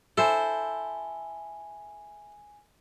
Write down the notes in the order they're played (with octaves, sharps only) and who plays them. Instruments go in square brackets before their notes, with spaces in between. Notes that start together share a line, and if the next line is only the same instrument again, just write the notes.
[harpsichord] E4 [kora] A4 C5 [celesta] G#5 G7